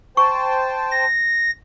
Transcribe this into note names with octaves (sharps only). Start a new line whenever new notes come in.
C5 G5 A5 C#6
A#6